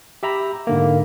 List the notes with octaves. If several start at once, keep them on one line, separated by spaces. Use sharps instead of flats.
G4 E5 A#5 B5
G#2 D3 A#3